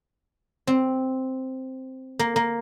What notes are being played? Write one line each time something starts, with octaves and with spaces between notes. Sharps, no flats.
C4
A#3
A#3